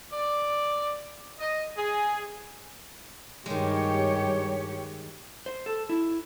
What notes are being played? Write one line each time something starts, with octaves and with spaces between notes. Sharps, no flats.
D5
D#5
G#4
G2 D#3 G#3 G4 C#5
C5
A4
E4